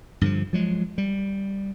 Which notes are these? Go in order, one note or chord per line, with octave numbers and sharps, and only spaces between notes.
G2 D3 D#3 F3
F3 F#3 G#3
G3